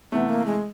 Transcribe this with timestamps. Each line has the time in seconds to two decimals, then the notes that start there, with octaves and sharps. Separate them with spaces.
0.12 C3 E3 A3 B3
0.29 A#3
0.46 G#3